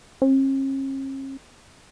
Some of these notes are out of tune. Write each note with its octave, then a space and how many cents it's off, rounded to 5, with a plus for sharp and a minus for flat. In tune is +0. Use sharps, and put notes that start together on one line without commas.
C#4 -45